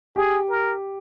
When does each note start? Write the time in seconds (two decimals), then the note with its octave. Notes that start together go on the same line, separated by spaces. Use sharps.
0.16 G4 G#4
0.50 A#4